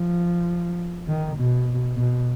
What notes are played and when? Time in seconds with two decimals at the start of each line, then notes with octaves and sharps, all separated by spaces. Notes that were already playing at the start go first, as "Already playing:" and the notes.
Already playing: F3
1.08 D#3
1.36 B2
1.96 B2